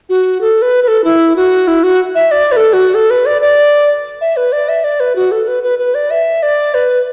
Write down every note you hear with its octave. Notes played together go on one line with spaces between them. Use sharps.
F#4
A4
B4
B4
A4
E4
F#4
E4
F#4
E5
D5
B4
A4
F#4
A4
B4
D5
D5
E5
B4
D5
E5
D5
B4
F#4
A4
B4
B4
B4
D5
E5
D5
B4